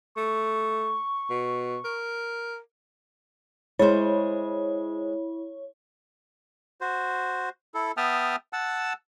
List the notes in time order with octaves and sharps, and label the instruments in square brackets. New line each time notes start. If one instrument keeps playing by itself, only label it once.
[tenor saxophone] A3 [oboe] C#6
[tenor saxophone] B2
A#4
[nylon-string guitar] G#3 C5 [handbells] E4 [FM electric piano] C#5
[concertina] F#4 C5
E4 A4
B3 E5 G5 A5 D#6 F6
F#5 A5 E6